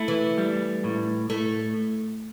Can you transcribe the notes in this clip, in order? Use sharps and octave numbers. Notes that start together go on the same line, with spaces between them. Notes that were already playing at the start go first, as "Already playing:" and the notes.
Already playing: A3 E4
E3
G3
A2
A2 A3